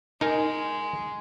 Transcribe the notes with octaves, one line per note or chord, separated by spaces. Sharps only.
G#3 D#4 A#4 G#5